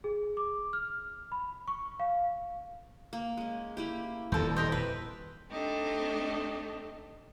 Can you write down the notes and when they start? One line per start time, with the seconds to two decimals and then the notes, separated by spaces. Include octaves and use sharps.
0.04 G#4
0.37 D6
0.73 F6
1.32 B5
1.68 C#6
2.00 F5
3.13 A#3
3.37 G#3 C#4
3.77 A#3 E4 G4
4.32 D#1 F2 A4 C5
4.56 G4 A#4 C5 D#5 G5
4.72 B4 E5
5.49 A3 C4 D4 D#4 G4 A4